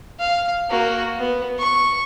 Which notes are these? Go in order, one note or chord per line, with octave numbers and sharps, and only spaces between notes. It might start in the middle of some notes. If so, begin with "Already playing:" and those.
F5
A#3 F#4
B3
C#6